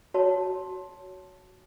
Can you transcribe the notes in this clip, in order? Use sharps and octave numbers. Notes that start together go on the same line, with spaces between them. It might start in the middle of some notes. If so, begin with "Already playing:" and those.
F#4 C#5 A5